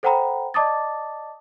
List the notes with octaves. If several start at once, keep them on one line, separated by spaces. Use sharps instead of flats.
A4 C5 F#5 G5 A#5 B5
D5 D#5 A5 D6 D#6 A6